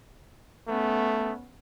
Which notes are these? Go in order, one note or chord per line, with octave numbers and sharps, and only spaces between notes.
A3 B3 C#4